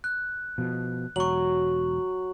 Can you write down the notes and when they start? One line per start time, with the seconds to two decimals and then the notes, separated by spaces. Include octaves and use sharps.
0.04 F#6
0.58 B2 F3
1.16 E1 F#3 C#6 F#7